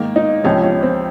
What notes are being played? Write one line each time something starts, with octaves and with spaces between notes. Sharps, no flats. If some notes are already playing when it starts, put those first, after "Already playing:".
Already playing: G#2 D#3 A#3
D#4
C#2 C3 F3 C#4
C#4
C4